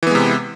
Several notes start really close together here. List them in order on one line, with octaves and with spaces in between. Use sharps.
E3 B3 G#3 C3